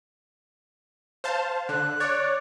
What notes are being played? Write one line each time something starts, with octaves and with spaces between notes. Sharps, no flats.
C5 F5 A5
D3 F#6
C#5 D5